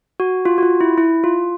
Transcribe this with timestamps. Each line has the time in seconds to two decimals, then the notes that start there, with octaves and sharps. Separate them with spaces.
0.20 F#4
0.45 F4
0.58 F#4
0.63 F4
0.81 E4
0.98 E4
1.24 F4